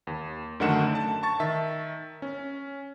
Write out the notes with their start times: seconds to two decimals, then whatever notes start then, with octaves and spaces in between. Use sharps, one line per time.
0.07 D#2
0.60 F#2 D3 D#3 A3 F#5 E7
0.95 A5
1.23 A5 C#6 A6
1.40 D#3 E5
2.22 C#4